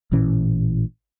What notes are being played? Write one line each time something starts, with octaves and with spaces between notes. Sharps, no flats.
A1 A#2 E3 C#4